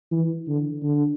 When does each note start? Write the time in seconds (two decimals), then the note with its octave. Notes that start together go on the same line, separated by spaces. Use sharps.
0.12 E3
0.48 D3
0.83 D3